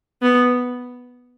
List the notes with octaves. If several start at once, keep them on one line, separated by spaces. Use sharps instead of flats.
B3